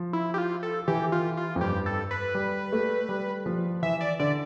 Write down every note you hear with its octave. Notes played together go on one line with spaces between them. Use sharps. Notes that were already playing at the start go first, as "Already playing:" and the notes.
Already playing: F3
E4
G4
F4
A4
E3 G4
F4
F4
F2
G2 G4
A4
B4
G3
A3
G3
F3
E3 E5
D5
D3 D5